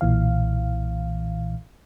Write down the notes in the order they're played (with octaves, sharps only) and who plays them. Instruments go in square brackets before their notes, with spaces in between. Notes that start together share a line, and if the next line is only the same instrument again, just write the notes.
[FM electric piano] B1 A#2 E3 F5